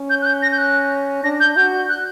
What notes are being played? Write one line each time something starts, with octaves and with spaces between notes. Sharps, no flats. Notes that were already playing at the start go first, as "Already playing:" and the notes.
Already playing: C#4
G6
F#6
G6
A#6
G6
F#6
D4 A#6
G6
F#4 G6
F#6